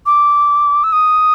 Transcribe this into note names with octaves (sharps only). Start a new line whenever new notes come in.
D6
E6
D#6